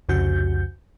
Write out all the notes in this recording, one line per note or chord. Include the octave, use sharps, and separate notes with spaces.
C2 F2 C#3 F#4 G6